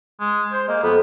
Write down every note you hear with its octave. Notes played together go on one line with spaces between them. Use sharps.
G#3
C5
G#3 A#3
F2 B3